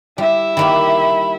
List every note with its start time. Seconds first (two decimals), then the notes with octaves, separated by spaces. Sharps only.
0.18 G3 E4 E5
0.57 D#3 G3 A#3 B5